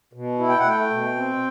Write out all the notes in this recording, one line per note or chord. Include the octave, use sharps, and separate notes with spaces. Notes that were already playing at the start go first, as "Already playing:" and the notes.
B2
E4
G5
F#5
A3 G5
B2
C4